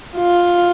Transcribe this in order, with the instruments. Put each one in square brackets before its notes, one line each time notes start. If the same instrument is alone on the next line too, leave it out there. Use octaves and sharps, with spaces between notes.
[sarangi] F4